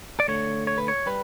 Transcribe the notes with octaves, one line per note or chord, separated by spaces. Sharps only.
D5
D3 A3 C#5
C#5
B4
C#5
G3 B4